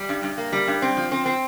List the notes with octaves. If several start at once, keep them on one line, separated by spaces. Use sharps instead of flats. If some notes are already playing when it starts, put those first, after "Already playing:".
Already playing: G3
G2
G2
A#3
G3
G2
C4
F3
C4
C4